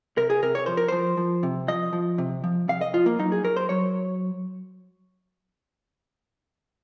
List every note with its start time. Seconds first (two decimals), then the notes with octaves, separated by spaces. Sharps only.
0.17 C3 A#4
0.30 G#4
0.42 C3 A#4
0.55 C#5
0.66 F3 C5
0.77 A#4
0.88 F3 C5
1.17 F3
1.43 C3
1.68 F3 D#5
1.93 F3
2.18 C3
2.44 F3
2.68 C3 F5
2.81 D#5
2.93 F3 F4
3.06 A#3
3.19 F#3 D#4
3.32 G#4
3.44 F#3 A#4
3.57 C5
3.69 F#3 C#5